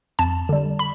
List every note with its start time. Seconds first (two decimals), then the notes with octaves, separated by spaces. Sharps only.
0.19 F2 A5
0.49 D3 G3
0.79 B5